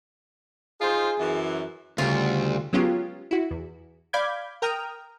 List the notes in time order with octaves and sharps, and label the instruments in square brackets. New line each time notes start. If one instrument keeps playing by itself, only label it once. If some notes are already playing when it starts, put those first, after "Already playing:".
[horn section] D#4 F4 C5 [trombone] G#4
[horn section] F#2 E3
[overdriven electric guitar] D2 [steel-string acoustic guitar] C#3 G3 [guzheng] F4
[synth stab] F#3 G#3 B3 C#4 F4 G4
E4 F#4
E2
D5 F5 B5 D6 G6 G#6
A#4 G5 A#5 D#6 F6